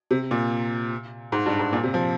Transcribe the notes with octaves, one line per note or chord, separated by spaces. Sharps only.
C3
A#2
G#2
G2
G#2
A#2
C3
F3